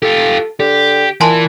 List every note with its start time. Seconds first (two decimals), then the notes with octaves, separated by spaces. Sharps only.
0.02 F4 G4 A4
0.60 D3 G4
1.21 A#2 E3 G#5 A5 C6